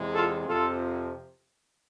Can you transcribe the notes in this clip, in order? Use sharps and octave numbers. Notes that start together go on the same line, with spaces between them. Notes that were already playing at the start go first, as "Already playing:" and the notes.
Already playing: E2 C3 G#3
F4 A4
F2 C3 F3 F4 A4